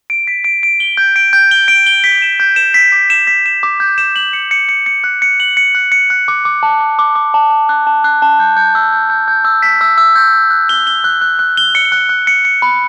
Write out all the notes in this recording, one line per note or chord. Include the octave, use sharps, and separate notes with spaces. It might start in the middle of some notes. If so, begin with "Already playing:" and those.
D7
B6
D7
D7
G7
G6
D7
G6
G7
D7
G7
B6
E7
G6
E7
B6
D6
E7
B6
E7
D6
G6
E7
F#7
C#7
C#7
C#7
C#7
F#6
C#7
F#7
C#7
F#6
C#7
F#6
D6
D6
A5
D6
D6
D6
A5
A5
F#6
A5
F#6
A5
G6
G6
E6
G6
G6
G6
E6
B6
E6
E6
G6
G6
F#6
G7
G7
F#6
F#6
F#6
G7
C#7
F#6
F#6
C#7
C#7
B5